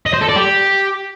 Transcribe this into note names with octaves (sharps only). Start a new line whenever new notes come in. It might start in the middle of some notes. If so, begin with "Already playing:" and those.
D#5
C5
A4
D5
G4